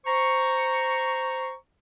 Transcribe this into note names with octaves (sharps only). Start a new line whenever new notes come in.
C5 A#5 C#6